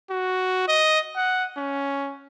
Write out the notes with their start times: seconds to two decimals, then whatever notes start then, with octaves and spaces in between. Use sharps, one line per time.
0.11 F#4
0.68 D#5
1.16 F#5
1.57 C#4